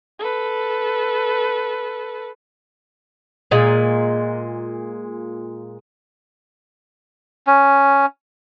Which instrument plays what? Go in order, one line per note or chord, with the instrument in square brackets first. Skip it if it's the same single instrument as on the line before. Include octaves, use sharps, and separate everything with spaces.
[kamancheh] A4 B4
[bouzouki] A#2 G#3
[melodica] C#4